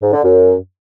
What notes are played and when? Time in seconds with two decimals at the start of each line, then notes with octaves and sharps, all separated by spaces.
0.02 G#2
0.13 D3
0.24 F#2